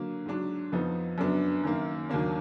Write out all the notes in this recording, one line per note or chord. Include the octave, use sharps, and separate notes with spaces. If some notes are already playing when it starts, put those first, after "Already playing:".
Already playing: D3 F#3 A#3
G#2 F#3 D4
F2 F3 B3 D#4
F#2 D3 F#3 B3 D4
F#2 D#3 A#3
D#2 D#3 F#3 A#3 D4